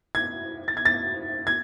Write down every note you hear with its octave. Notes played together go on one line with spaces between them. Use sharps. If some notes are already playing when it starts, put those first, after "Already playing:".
G#6
A6
G#6
A6
G#6